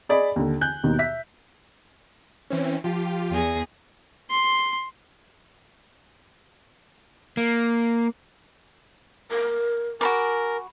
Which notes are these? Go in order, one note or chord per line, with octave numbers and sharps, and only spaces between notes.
G#4 D5 D#5 B5
D#2 D3
G#5 F#6 G6
D#2 B2 D#3
E5 B6
E3 C4 C#4
F3 F4 G4
E2 G#4 A#6
C6
A#3
A#4
F#4 A#4 G#5 B5 D6